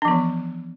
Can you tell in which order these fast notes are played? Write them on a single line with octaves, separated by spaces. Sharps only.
D4 F3 B3 E3